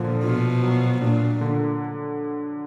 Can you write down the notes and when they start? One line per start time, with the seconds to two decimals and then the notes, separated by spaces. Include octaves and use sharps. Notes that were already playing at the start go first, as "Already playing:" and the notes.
Already playing: A#2 D3 F3
0.23 B2 F4
0.63 F#3
1.01 A#2 D4
1.41 D3